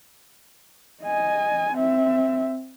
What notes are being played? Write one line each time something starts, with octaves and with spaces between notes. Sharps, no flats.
D#5 G#5
C4 E5